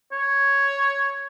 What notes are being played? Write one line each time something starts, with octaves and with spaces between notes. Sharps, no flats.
C#5